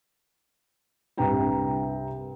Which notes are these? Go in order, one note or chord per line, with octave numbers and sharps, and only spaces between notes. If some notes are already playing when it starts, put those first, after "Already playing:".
C2 G2 B4 G5 A#5